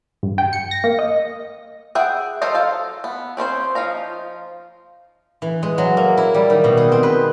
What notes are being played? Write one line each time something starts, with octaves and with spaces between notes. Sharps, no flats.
G2
G5
C#7
A#6
A#3
D#5
G#4 E5 F#5 G5
F#3 A4 A#4 C5 D#5
A4 F5
B3
C4 C#4 D#4 C5
F3 D#4 F5 A#5
E3
G#3
F#3
A#3
E4
G3
D#3
B2
G#4
C4
B4